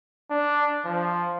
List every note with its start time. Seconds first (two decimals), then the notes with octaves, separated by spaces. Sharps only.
0.31 D4
0.85 F3